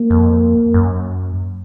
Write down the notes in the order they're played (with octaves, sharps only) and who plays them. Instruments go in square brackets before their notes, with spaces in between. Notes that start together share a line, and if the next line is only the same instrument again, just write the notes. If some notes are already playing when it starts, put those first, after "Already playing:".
Already playing: [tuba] A#3
[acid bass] F2
F#2